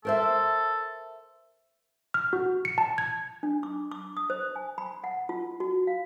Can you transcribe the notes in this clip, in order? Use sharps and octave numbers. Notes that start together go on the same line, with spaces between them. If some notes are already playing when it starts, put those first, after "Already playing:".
A4 A#4 C5 E5
F6
F#4
C#7
A5
G#6
D4
D6
D6
D#6
C5
G#5
B5
F#5
F4
F#4
F5